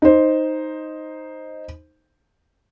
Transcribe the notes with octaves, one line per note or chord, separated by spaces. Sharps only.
D#4 C5